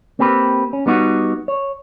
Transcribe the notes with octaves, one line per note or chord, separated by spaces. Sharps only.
A#3 C4 G4 G#4 B4
C#4
G3 B3 D#4 F4 F#4
C#5